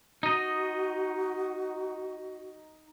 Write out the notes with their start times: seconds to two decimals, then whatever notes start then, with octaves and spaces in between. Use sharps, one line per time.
0.23 D#4 F#4 D#5